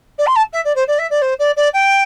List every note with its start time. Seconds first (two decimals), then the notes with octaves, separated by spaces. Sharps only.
0.18 D5
0.26 C6
0.36 A5
0.53 E5
0.64 D5
0.75 C5
0.87 D5
0.98 E5
1.10 D5
1.21 C5
1.39 D5
1.56 D5
1.73 G5